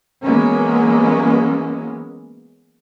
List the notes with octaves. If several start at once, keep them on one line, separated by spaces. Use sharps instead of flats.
E3 F#3 G#3 A#3 B3 C#4